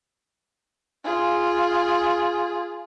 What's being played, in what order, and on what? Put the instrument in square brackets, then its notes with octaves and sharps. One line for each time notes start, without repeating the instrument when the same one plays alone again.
[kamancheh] F4 G#4